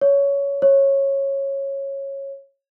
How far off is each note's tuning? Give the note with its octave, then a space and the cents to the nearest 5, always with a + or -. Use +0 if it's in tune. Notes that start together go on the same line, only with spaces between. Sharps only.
C#5 +15
C#5 -15